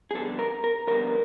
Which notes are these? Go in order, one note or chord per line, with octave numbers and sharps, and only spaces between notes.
G#4
F2 D3 G3 B3 A4
A#4
A#4
F2 D3 G3 B3 A#4